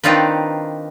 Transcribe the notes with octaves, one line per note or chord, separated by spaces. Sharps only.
D#3 C4 D4 D#4 F4 B4